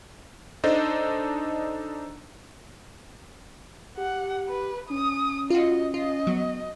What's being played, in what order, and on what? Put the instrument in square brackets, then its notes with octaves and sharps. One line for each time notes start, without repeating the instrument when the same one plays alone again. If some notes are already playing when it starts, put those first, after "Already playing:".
[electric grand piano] D4 D#4 A4 C5 D#5
[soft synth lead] G4 [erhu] F#5
[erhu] B4
[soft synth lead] C#4 [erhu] D#6
[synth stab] F4 F#4 [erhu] D#5
[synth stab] F4 [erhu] D#5
[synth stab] F#3 [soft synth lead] B3